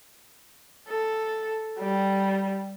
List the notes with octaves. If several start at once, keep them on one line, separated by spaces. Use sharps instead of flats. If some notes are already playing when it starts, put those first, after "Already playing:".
A4
G3